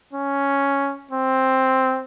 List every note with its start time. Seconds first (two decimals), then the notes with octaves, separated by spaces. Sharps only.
0.13 C#4
1.11 C4